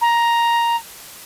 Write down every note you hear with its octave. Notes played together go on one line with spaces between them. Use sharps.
A#5